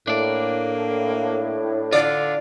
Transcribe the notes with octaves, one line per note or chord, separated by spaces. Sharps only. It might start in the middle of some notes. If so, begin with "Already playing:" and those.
A2 A#3 D4 D5
D3 D4 F4 D5